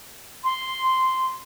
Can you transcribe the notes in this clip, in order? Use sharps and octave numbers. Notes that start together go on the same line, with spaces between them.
C6